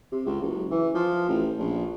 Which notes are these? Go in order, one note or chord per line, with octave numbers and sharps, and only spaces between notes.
C3
C#2
F#1
E3
F3
A1
A#1